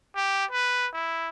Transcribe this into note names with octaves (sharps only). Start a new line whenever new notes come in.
G4
B4
E4